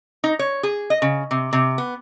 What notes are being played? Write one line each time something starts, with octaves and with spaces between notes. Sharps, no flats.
D#4
C#5
G#4
D#5
C#3
C3
C3
B3